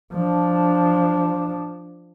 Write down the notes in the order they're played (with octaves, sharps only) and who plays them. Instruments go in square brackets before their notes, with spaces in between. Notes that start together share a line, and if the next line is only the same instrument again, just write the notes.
[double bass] F3 D4